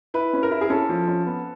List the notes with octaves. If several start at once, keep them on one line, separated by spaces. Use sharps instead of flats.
E4 B4
C#4
A#4
E4
G#4
C#4 A4
F3
C#4
B3